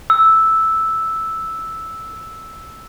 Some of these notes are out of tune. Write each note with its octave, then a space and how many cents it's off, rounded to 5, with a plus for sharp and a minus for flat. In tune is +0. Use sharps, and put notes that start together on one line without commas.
E6 -5